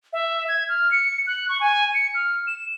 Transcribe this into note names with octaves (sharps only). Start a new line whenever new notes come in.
E5
G#6
F6
C#7
F#6
C#6
G#5
C#7
F6
E7